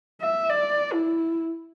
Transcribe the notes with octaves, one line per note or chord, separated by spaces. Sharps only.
E5
D5
E4